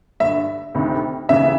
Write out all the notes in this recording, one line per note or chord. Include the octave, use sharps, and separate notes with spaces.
G2 D3 E5
D2 C3 D#3
D#2 C#3 E3 E5